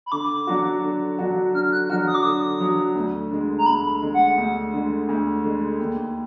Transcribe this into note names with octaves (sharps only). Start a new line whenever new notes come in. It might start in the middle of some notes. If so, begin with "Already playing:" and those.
B5
D3 D6
F#3 D4 F#4
D3
F#3 D4 F#4
D3 F6
F#6
F#3 D4 F#4 F6
D#6
D6
D3 D#6
F#3 D4 F#4
D2
D3 G#3
A#5
D2 B5
D3 G#3
F#5
D2
D3 G#3
D2
D3 G#3
D#2